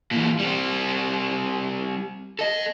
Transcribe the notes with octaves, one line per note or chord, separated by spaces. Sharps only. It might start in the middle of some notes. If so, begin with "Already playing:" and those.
A#2 E3
G3 C4
A4 D#5